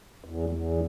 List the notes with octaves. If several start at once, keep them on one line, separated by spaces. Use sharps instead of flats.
E2
E2